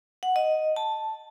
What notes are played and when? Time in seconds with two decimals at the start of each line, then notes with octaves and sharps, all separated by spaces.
0.23 F#5
0.36 D#5
0.76 A5